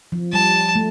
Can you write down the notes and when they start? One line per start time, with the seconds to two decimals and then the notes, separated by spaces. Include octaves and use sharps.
0.12 F3
0.33 G3 A5
0.75 A3